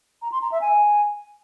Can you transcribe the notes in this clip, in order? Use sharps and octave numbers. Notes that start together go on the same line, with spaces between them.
A#5
C6
A#5
E5
G#5